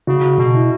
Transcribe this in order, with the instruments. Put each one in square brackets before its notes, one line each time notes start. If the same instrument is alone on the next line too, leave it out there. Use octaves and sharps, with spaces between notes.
[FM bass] C#3 [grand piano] F#4
[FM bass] B2
[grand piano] E4